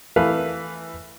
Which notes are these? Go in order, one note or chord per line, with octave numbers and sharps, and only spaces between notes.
E3 A3 B4 F5